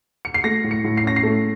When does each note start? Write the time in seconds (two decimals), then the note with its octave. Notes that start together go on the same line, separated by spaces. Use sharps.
0.25 C#7
0.34 C7
0.44 A3 A#6
0.64 A2
0.71 C#7
0.84 A2
0.97 C7
1.04 C#4 A#6
1.16 C7
1.23 A3